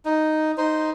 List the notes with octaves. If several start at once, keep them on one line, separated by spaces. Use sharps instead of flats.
D#4
D#4 C5